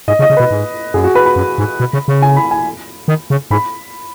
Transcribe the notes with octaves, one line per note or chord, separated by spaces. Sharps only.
G#2 D#5
C#3
D#5
C#3
B2 B4
G#2
F#2 G#4
F#4
B4
B5
F#2
G#2
B2
C#3
C#3
G#5
B5
G#5
D#3
C#3
G#2 B5